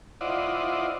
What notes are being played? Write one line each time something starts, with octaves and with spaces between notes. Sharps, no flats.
E4 F4 C5 D5 D#5 F#5